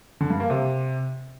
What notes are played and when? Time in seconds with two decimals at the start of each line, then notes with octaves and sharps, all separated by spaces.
0.20 D3
0.30 G2
0.40 A#3
0.50 C3